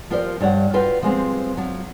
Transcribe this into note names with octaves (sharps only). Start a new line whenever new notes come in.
F3 A#3 F4 G4 C5 D5
G2 G3 C#5 F#5
F4 F#4 B4 G5
F3 G3 G#3 B3 C4
F3 F#3